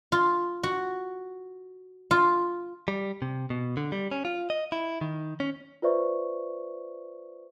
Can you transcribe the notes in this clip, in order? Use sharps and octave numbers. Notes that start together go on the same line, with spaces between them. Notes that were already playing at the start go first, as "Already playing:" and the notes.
F4
F#4
F4
G3
C3
B2
D3
G3
C#4
F4
D#5
E4
D#3
C#4
F4 B4 C5 D5 E5 C#6